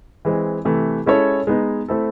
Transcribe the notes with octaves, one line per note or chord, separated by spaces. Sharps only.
E3 G#3 C4
C3 E3 A3
G#3 C#4 E4 A4 C#5
G#3 B3 D#4
A3 C4 E4 A4